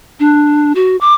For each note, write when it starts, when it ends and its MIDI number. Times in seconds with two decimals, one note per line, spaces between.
0.20 0.73 62
0.75 0.97 66
1.01 1.14 86